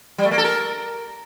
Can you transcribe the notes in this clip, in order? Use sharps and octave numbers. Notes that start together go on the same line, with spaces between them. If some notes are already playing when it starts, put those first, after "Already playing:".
G3
A3
A#3
A4
A#4